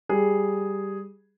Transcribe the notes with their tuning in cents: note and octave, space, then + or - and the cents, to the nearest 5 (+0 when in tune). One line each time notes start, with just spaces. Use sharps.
G3 +0 G#4 +0